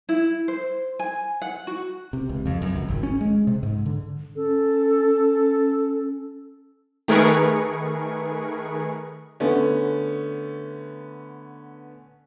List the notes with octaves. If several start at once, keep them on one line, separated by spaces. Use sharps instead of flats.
E4
C5
G#5
F#5
F#4
C3
C#2
F2
F#2
C#2
G#1
C#4
G#3
C3
G#2
D3
C#4 A4
D#3 A3 G#4 A#4 B4 C#6
D3 A3 B3 C#4